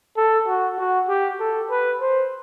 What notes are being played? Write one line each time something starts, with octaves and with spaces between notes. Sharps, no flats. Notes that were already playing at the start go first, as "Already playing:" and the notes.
A4
F#4
F#4
G4
A4
B4
C5